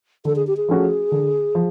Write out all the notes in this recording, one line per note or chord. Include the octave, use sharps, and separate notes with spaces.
D3 A4
G#4
G4
G#4
F3 A3 C#4 F#4
D3
F3